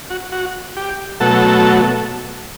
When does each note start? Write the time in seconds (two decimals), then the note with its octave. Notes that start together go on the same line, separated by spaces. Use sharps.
0.10 F#4
0.32 F#4
0.77 G4
1.20 B2 F#3 A3 A4